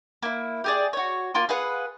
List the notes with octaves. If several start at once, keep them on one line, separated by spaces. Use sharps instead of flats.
A#3 E4
G4 G#4 D5
F#4 C#5
A#3 F4 C6 D6
G#4 B4 F5 F#5